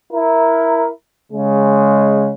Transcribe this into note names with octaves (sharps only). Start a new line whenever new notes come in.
E4 A#4
C#3 G#3